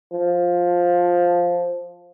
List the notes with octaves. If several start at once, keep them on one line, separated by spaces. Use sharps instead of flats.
F3